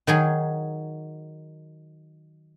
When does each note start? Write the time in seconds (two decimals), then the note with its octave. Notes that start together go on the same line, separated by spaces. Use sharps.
0.07 D#3 F#3 G#4